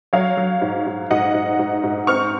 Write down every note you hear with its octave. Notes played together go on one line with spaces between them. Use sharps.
F#3 C#5 F5
F#3
G#2
G#2
G#2 D#5 F#5
G#2
G#2
G#2
C4 C#6 F6